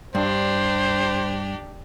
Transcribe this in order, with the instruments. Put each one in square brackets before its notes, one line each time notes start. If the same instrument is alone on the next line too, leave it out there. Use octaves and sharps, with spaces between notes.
[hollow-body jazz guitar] G2 [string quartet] D4 G4 [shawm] C5